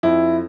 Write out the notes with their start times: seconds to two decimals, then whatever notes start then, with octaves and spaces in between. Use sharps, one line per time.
0.03 F2 E4